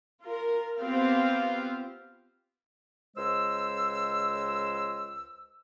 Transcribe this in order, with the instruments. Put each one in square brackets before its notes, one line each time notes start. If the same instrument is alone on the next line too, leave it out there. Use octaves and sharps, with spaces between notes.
[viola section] F4 A#4
B3 C4 F4 G4 C5 F5
[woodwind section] C#2 G#3 C5 E6